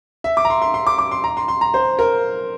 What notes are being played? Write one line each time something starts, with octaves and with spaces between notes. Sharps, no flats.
E5
D6
A#5
C6
C6
C6
D6
D6
C6
A#5
C6
C6
A#5
C5
A#4